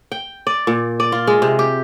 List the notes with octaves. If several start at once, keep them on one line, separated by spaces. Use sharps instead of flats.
G5
D5
A#2
D5
F4
G#3
C3
G4